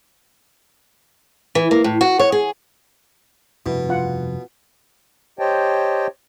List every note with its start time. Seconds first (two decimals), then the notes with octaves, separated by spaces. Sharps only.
1.55 E3
1.71 A#3
1.84 A2
2.01 F#4
2.19 C#5
2.32 G#4
3.66 F1 G2 B2 E4
3.89 F4 F#5
5.39 G4 C5 C#5 D#5 G5 A5